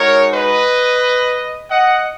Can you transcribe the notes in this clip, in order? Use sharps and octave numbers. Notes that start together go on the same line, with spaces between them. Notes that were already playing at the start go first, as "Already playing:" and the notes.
Already playing: G#3 D#4 F#4 A#4 C#5
B4 D#5
D#5 F#5